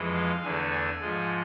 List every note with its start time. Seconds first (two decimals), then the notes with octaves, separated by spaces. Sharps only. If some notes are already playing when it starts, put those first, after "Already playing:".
Already playing: F2 E3 G#3
0.14 F5
0.43 E2 D3 A3 G#5
0.71 G#5
1.01 G#2 F3 G#3